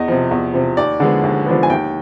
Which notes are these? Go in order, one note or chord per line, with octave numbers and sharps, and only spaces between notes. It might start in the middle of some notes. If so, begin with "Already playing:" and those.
Already playing: E2 D#5
C3 F3
E2
C3 F3
D#2 D5
D3 F3 G#3 B3
D#2
D3 F3 G#3 B3
G#5
D#2 G5